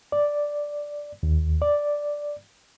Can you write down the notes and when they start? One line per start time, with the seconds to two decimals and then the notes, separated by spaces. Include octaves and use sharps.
0.12 D5
1.23 D#2
1.62 D5